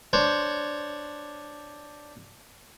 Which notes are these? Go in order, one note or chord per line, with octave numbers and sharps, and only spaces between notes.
D4 C5 C#5